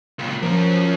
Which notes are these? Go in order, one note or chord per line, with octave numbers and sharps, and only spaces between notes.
C#2 A#2
F3 C#4 A#4